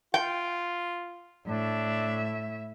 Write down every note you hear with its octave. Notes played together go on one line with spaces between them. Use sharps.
F4 G5
A2 D4 E5